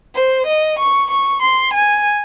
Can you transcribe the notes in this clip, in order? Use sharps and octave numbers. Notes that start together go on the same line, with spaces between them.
C5
D#5
C#6
C#6
C6
G#5